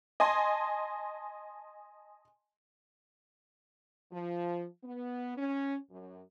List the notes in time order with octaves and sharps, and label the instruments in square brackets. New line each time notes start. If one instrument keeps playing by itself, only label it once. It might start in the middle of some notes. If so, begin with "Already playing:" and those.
[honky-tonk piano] D#5 G#5 A5 C6
[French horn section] F3
B3
C#4
F#2